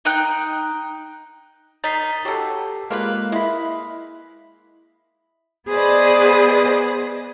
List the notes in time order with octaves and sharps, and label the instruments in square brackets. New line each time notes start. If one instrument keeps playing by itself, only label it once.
[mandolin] D#4 G5 F#6
[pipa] D#3 D#4 [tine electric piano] A6 B6 C7
[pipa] B2 F#3 [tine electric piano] G4 A4
[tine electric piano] G#3 A#3 F6 [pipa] C4 F4 B4
[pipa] G#3 [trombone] E4 [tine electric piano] D#5 B5
[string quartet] B3 G#4 B4 C5 D5 D#5